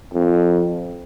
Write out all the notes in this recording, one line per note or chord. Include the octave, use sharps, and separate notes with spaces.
F2